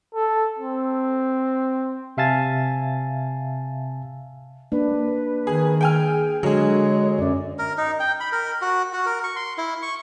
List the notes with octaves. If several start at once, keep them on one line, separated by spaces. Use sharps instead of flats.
A4
C4
C3 E5 F5 G#5 A5 A6
A#3 D4 B4
D#3 G#4
G#4 G5 G#5 F6
D3 F#3 G#3 G#4 C#5
F#2 C#4 D5
A#4
D#4
G5
B5
A#4
F#4
F#4
A#4
C#6
C6
E4
C#6